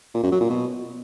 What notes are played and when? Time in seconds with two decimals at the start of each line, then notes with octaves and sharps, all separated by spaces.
0.14 A#2
0.23 F#2
0.32 F#3
0.41 A#2
0.50 B2